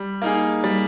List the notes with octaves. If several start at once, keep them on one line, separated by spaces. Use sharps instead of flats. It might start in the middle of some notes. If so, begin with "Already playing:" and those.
Already playing: G3
A#3 D#4 G#4
G3